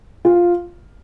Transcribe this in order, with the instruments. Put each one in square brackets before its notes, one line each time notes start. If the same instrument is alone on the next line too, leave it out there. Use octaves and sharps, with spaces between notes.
[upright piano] F4